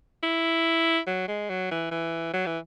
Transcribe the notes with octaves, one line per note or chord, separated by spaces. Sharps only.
E4
F#3
G#3
F#3
E3
E3
F#3
E3